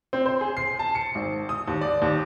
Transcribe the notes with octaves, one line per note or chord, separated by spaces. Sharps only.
C4
C5
G#4
C7
A5
C#7
G#1
D#6
D#2
D5
D#2